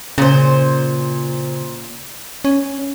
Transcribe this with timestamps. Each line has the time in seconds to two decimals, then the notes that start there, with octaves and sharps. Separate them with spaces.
0.18 A#2 C#3 C5
2.44 C#4